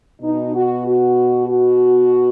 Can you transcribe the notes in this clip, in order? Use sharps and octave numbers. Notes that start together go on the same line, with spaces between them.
B2 D#4
F#4
F#4
F#4